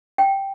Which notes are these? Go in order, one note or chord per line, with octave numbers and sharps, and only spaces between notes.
G5